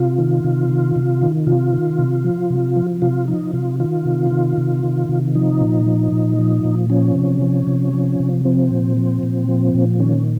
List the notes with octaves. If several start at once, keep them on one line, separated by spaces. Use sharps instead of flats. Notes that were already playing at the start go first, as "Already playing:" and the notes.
Already playing: C3 F4
D#3
C3
D#3
C3
D#3
C3 F4
D#3
C3
F3
C3
F3
C3 F4
F3 D#4
C3 F4
D#3 F4
C3
D#3
C3
D#3
C3
F3 D#4
A#2
F3
A#2
F3
A#2
F3 C#4
C3
F3
C3
F3
C3
F3 C4
A#2
F3
A#2
F3
A#2
D#3 C#4